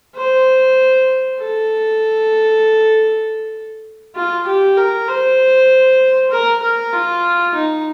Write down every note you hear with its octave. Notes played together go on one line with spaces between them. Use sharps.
C5
A4
F4
G4
A#4
C5
A#4
A#4
F4
D#4